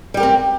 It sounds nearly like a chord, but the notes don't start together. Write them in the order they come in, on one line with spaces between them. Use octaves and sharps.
G3 G4 A#4 C4